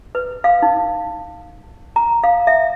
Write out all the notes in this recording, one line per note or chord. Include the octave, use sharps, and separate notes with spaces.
B4
F5
D#4
A#5
F5
E5